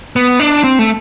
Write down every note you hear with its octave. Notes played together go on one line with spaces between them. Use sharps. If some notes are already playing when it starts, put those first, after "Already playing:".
B3
D4
C4
A3